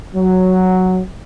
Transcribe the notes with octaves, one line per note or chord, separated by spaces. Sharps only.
F#3